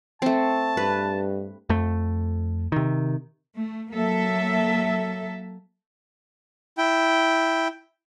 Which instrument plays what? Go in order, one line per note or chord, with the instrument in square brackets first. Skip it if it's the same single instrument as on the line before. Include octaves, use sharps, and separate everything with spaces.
[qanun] A3 C4 [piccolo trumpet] A5
[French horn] G2 [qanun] B4
[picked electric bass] F2 A3
C3 D#3
[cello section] A3
F#3 A#3 A4 E5
[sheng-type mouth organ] E4 G5